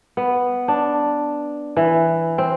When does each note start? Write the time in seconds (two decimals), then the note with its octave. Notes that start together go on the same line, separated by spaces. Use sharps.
0.17 B3
0.68 D4
1.77 E3
2.38 C4